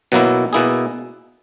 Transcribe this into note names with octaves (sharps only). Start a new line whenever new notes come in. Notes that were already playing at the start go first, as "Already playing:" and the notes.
B2 F#3 A#3 E4
B2 A#3 E4 G#4